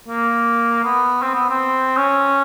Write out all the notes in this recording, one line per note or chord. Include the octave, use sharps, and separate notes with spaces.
A#3
B3
C4
B3
C4
C#4